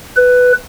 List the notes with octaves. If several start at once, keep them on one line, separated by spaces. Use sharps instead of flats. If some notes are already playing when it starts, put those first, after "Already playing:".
B4